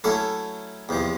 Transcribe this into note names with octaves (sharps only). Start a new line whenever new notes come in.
F#3 A3 C#4 E4 A4
E2 C3 F3